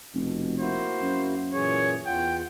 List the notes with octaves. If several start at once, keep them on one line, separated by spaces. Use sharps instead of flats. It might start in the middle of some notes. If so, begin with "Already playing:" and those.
F1 B2
A#3 E4 F#4 C5
F#2
A#2 E3 G#4 C#5
E2 F4 F#5 G5